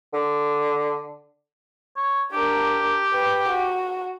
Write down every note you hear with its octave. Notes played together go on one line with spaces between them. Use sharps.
D3
C#5
D4 G4 A#4
B4 G5
F#4